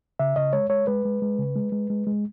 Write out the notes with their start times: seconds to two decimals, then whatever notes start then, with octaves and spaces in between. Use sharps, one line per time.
0.19 C#3 E5
0.36 C#3 D#5
0.53 G#3 C#5
0.70 G#3 C#5
0.87 G#3 B4
1.05 G#3
1.22 G#3
1.39 C#3
1.56 G#3
1.72 G#3
1.90 G#3
2.07 G#3